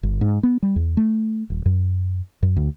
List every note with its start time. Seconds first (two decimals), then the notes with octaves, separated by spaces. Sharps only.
0.03 G1
0.21 G#2
0.43 B3
0.63 G3
0.76 E2
0.97 A3
1.50 D#1
1.66 F#2
2.43 F#2
2.57 D2